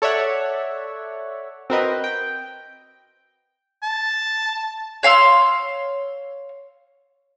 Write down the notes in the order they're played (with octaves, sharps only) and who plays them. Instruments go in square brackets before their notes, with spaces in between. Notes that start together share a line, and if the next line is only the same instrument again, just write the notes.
[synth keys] A4 C#5 D5 E5 F#5
C4 F#4 A#4 B4 D#5
G5
[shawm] A5
[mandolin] C#5 F5 C6 E6